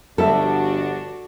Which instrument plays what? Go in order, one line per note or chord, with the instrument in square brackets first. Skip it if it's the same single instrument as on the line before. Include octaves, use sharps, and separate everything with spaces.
[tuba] G1 [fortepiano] F3 G3 E5 [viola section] D4 F#4 [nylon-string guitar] A4